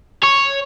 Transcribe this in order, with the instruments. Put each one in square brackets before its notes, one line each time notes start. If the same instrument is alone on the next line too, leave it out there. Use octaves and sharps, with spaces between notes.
[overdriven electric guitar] C#5